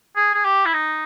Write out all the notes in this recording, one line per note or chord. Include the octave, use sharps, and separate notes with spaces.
G#4
G#4
G4
E4
D#4